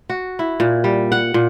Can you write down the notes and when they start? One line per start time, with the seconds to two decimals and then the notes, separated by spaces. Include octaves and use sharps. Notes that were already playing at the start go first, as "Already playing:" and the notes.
0.10 F#4
0.39 E4
0.60 A#2
0.84 G3
1.12 F#5
1.34 A#2